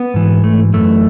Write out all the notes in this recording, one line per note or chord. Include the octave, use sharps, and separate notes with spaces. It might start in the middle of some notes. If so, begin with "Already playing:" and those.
Already playing: B3
G#2 E3
A3
F#2 E3 A3